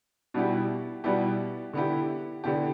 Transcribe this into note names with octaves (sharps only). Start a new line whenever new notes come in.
B2 G3 B3 E4 G4
B2 G3 B3 E4 G4
D3 B3 E4 G4
D3 B3 E4 G4